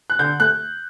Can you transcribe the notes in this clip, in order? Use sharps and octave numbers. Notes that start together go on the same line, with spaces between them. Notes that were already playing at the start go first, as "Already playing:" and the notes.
F#6
D3 G6
A3 F#6